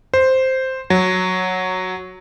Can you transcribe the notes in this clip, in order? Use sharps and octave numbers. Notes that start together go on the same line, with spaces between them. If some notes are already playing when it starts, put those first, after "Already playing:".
C5
F#3